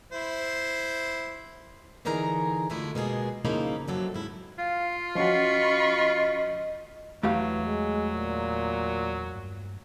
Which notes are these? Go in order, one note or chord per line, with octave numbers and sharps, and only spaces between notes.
E4 C5
D3 E3 D#4 G#4 A#4 A#5
F#2 D3 G#3 A3 E4 F4
B2 G#3 A#3 G#4
C#3 F3 A#3 D#4 E4
F#2 C3 F#3 A4
G#2 E4
F4 F5
F3 C#4 F#4 D#5 B5 C#6
E2 E3 F#3 A3 G4 F5
G#3
A#2
G2